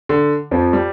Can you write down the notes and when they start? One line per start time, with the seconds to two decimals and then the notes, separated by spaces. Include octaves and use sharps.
0.09 D3
0.51 F2 F3
0.73 G3